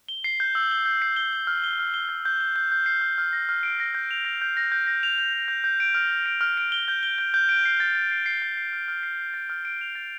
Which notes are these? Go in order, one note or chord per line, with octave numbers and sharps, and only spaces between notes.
G7
C7
G6
E6
G7
G6
C7
G7
G7
F6
G7
F6
G7
G6
G6
G7
G6
G6
C7
F6
F6
A#6
F6
D7
A#6
G6
F7
A#6
G6
A#6
G6
A#6
F7
G6
G6
G6
G6
D7
F6
F6
D7
F6
D7
G7
G6
G7
G6
G6
D7
C7
A6
A6
C7
C7
A6
C7
F6
F6
C7
C7
A6
F6
D7
F7
A6